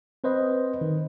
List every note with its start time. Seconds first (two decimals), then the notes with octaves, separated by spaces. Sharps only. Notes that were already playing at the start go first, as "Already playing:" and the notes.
0.24 C4 B4 C5 D#5
0.81 D#3